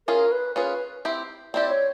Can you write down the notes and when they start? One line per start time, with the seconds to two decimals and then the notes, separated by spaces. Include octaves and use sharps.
0.08 C#4 F4 G#4 A#4
0.32 B4
0.56 C#4 F4 G#4 B4
1.05 C4 E4 G4
1.54 C4 E4 G4 D5
1.69 C#5